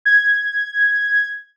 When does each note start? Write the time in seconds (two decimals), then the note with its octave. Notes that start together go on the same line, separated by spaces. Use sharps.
0.05 G#6